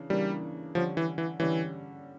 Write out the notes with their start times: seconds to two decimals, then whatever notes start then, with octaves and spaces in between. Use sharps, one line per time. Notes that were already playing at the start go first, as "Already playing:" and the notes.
Already playing: C#3 E3 D4
0.10 C#3 E3 G3 A#3 D4
0.75 D3 F3 G3 C#4
0.97 E3
1.18 E3
1.40 D3 E3 G3 C#4